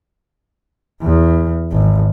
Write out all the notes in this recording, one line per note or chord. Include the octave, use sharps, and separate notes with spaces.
E2
G#1